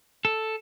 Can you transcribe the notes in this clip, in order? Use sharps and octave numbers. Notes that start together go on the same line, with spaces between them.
A4